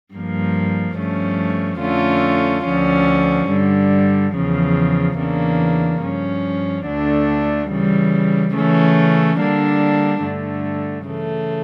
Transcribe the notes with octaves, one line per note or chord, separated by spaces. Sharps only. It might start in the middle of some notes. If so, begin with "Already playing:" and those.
G2 F3 A#3
G2 F3 A3 C#4
F2 D3 A3 C#4 F4
D2 D3 F3 C#4
G2 D3 G3
E2 C#3 F3
E2 C#3 E3 A#3 D4
G2 F3 C#4
D2 D3 A3 D4
C#3 E3 G3
C#3 E3 A3 C#4
D3 G3 A#3 D4
G2 D3 A3
C#3 E3 A3